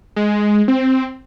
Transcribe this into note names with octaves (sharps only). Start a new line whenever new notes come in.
G#3
C4